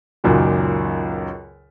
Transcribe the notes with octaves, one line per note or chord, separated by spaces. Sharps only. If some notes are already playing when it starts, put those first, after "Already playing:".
C#2 F#2 A#2 D#3